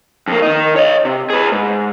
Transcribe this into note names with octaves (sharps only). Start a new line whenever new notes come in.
F2 A#3
D#3 D#4
C#5 D#5
C3
G#4 B4
G#2